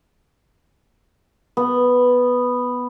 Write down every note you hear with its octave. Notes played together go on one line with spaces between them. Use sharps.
B3